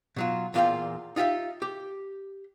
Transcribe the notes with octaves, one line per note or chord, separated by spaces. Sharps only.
B2 F#3 F4
E2 A#2 F4 C5 F5 G5
D#4 F4 G4 E5 F5
G4